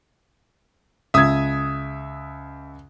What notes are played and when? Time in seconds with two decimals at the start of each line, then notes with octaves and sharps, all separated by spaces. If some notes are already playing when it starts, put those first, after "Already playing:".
1.14 C#2 E5 D#6 G#6